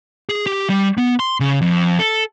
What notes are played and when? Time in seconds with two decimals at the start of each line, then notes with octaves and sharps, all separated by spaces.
0.29 G#4
0.47 G4
0.70 G3
0.97 B3
1.20 C6
1.40 C#3
1.62 F2
1.99 A4